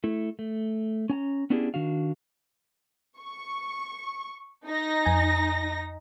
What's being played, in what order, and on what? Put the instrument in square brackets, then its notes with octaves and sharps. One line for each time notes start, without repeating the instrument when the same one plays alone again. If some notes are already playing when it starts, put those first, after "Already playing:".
[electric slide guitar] A3 E4
A3
C#4 G#5 A#5
B3 C#4 D4 E4 G4 G#4
D#3 D4 F#4 F5
[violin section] C#6
D#4 A#6
[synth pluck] F2 G#5